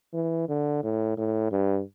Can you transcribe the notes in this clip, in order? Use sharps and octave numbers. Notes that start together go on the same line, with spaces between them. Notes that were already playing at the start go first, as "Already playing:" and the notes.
E3
D3
A2
A2
G2